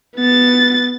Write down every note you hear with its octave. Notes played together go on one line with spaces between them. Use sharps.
B3 A6